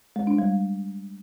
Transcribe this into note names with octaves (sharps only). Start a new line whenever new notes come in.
G#3
D4
G3